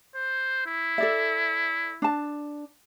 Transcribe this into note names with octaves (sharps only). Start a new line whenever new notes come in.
C5
E4
A4 D5 E5
D4 A5